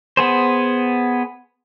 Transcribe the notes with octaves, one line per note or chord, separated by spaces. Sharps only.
B3 G#4 C5